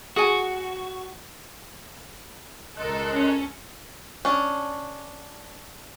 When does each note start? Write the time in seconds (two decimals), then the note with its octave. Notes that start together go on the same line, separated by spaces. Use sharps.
0.16 F#4 G#4 G#5
2.77 C#2 A4 A#4 D#5 C6 F#6
3.11 C#4
4.25 C#4 D4